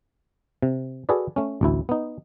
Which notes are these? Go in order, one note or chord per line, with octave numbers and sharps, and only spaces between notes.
C3
F#4 G#4 A4 B4 D5
A3 C#4
A1 D2 E4
B3 D#4